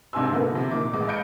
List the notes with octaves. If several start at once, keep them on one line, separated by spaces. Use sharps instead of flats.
G#2 C3 D4 G#5 C6 E6
D3 A#3 B3 D#4 F#4 B4
C3 F3
A#2 D#3 D6
A1 G#3 D6
D#5 F5 B5 G6 C#7 D7